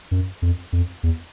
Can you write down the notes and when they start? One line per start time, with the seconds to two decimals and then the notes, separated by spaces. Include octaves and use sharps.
0.11 F#2
0.42 F2
0.73 F2
1.03 E2